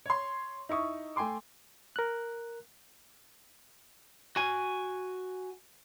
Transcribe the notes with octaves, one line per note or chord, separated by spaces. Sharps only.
C#5 C6
D#4 E4 C#6 D#6
A3 G5 G#5 C6 D6
A#4 F#6
F#4 G#5